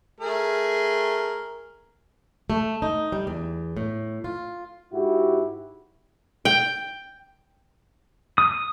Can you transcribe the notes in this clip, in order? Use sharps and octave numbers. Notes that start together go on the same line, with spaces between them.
A3 G#4 A#4
A3
D#4
G3
E2
A2
F4
G#2 E4 F#4 G4
G5
D#6